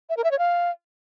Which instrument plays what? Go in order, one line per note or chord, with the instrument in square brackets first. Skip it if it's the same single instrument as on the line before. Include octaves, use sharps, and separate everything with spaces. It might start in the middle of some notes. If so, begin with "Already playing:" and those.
[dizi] E5
A#4
E5
C#5
F5